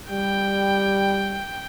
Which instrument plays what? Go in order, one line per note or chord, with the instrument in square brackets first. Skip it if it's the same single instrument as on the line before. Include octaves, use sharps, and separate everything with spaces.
[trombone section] G3 [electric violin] G5